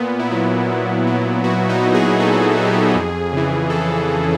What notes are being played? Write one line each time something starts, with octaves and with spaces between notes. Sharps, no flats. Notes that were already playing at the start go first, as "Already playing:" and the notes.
Already playing: A#2 B3
E4
F#3
A#2
F#3
A#2 F#4
D#4
F#3
G#4
A#2 A4
F#3 G#4
G4
G#4
F2
C#3 E3
F2 A4
C#3 E3